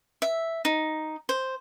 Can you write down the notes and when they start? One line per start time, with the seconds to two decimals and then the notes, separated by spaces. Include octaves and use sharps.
0.22 E5
0.65 D#4
1.29 C5